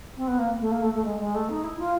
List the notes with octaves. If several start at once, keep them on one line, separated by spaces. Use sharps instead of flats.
C4
B3
A#3
A3
A#3
A3
A3
G#3
G#3
A3
D#4
E4
F4